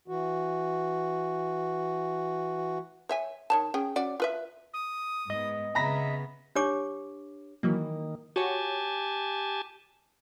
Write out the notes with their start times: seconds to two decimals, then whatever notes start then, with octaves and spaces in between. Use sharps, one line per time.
0.08 E3 F#4
3.09 C#5 E5 G#5
3.50 D#3 C#5 A5
3.74 C#4 G#4 G5
3.96 C#4 F#4 D5
4.20 F4 B4 E5
4.74 D#6
5.30 G#2 B3 D#5
5.75 C#3 B3 E5 A#5 B5 A#6
6.55 D4 G4 C#5 D6
7.63 D#3 E3 F#3 A#3
8.36 F#4 G4 C#5 G#5 A5